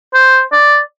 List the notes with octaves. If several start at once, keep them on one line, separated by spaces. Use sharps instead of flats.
C5
D5